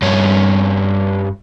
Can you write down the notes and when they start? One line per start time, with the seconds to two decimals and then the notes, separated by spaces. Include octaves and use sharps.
0.02 G2 C#4